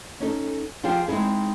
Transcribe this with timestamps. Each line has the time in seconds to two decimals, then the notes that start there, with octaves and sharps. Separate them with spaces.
0.20 C#4 D#4 A4
0.83 F3 F4 G4 G#4 C5 G5
1.08 G#3 C4 D#4 E4 G#4